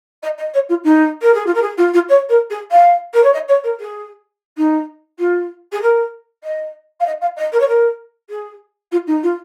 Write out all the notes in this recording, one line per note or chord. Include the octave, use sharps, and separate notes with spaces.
D#5
D#5
C#5
F4
D#4
A#4
G#4
F4
A#4
G#4
F4
F4
C#5
A#4
G#4
F5
A#4
C#5
D#5
C#5
A#4
G#4
D#4
F4
G#4
A#4
D#5
F5
D#5
F5
D#5
A#4
C#5
A#4
G#4
F4
D#4
F4